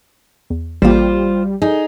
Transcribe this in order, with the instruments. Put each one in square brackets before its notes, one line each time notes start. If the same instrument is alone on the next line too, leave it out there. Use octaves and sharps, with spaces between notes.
[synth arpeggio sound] E2
[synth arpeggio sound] A1 A#3 [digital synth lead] G3 [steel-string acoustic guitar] F4 C5
[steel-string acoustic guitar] D#4 G#4